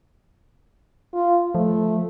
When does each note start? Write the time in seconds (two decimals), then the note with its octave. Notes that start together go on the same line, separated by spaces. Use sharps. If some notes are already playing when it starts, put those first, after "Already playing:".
1.14 F4
1.55 F3 A3